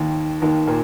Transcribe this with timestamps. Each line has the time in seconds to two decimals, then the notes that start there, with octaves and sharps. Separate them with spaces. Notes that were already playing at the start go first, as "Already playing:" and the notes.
Already playing: D#2 D#3
0.42 D#2 D#3
0.67 A#2 A#3